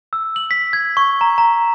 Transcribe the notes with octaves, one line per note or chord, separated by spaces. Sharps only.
E6
F#7
B6
G#6
C#6
A#5
A#5